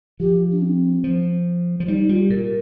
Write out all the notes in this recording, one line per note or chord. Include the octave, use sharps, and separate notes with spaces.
F3 G4
D4
C4
F3
F3
G3 D#4
D#4
G3 F4
G4
A#2 A#4